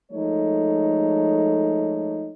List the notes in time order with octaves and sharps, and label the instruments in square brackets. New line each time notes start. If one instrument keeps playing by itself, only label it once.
[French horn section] F3 G#3 A3 D#4 A4 C#5